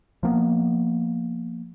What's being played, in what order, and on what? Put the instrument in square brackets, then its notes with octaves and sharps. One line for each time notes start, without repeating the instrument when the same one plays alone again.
[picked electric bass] F3 A#3 B3